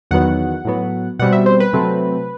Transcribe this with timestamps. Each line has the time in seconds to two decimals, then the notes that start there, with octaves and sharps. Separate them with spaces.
0.11 E2 D#3 F#3 B3 F#5
0.65 A2 F#3 B3
1.19 B2 G3 C4 F#5
1.32 E5
1.46 C5
1.60 B4
1.73 C3 F#3 A3 C4